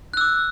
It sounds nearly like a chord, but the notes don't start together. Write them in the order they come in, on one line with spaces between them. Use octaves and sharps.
F#6 E6 D6